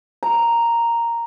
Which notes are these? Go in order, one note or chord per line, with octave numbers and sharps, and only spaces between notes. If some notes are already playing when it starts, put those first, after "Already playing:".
A#5